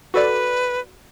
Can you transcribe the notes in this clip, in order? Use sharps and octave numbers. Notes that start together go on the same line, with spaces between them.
F#4 A4 B4 D5